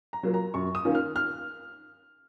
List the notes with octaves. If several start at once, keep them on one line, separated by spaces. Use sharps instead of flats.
A#5
F#3 A#3 F4
A#5
F#2 C#6
D#6
D#3 A#3 C#4 F4
F6
F6